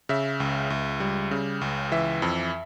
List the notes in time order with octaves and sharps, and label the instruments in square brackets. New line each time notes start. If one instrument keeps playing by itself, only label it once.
[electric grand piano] C#3 E5
C#2
C#2
G3
C#3
C#2
E3 E5
F2